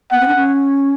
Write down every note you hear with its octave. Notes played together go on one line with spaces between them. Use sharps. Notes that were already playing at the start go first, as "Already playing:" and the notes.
B3 F#5
C4
D4
C#4